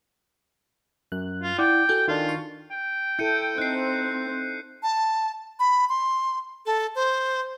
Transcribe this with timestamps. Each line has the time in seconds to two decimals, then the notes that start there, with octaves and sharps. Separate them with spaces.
1.12 F#2 F#6
1.42 F4
1.58 E4 D5 F#5 G5 D6
1.89 F#4 A4 G#5 G6
2.08 D#3 D4 F4
2.29 C6 C#6
2.71 G5
3.19 E4 A4 G6 C#7 D#7
3.58 C4 D#4 F#6 C7
4.83 A5
5.59 B5
5.89 C6
6.66 A4
6.95 C5